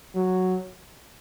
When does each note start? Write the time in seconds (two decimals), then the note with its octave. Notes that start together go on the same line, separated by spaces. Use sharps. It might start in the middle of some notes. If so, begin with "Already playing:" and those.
0.15 F#3